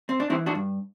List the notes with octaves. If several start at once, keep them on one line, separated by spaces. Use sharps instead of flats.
C4
D4
E3 C4 E4
D4 F#4
G2